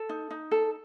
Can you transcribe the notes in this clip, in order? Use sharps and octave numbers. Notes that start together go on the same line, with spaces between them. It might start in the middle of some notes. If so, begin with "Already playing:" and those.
Already playing: A4
D#4
D#4
A4